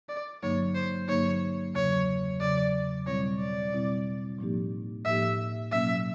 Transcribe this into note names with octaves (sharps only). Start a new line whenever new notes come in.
D5
G2 D3 F#3 A#3 D#4 C#5
C5
G2 D3 F#3 A#3 D#4 C#5
E2 C#3 F#3 C#5
E2 C#3 F#3 D5
B2 G3 C4 E4 C#5
D5
B2 G3 C4 E4
A2 F3 A#3 D#4 G4
A2 F3 A#3 D#4 G4 E5
B2 F#3 A#3 C#4 E5